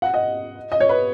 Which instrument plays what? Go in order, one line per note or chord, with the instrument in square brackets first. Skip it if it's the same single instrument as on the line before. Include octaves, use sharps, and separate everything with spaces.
[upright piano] F#5
D#5
D#5
C#5
B4